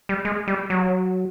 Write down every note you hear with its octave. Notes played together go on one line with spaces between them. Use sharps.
G3
G#3
G3
F#3